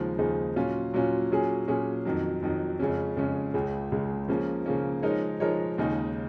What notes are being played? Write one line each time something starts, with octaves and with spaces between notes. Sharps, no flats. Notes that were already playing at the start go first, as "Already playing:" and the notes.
Already playing: D#2 C#3 F3 G#3 D#4
D#2 C#3 F3 G#3 D#4
A#2 F#3 C#4 F4
A#2 F#3 C#4 F4
A#2 F#3 C#4 G#4
A#2 F#3 C#4 G#4
F2 D#3 F#3
F2 D#3 F#3
F2 C#3 G#3 C#4
F2 C#3 G#3 C#4
C#2 C#3 G#3
C#2 C#3 G#3
C#3 F3 A#3 C#4
C#3 F3 A#3 C#4
F3 G#3 D#4 A#4 C#5
F3 G#3 D#4 A#4 C#5
D#2 C#3 G#3 D#4